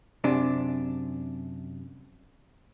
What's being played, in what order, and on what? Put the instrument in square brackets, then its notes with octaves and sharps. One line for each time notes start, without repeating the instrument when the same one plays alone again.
[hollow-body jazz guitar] F#2 C3 D4